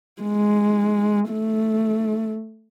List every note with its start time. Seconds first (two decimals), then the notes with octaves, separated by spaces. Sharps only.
0.22 G#3
1.31 A3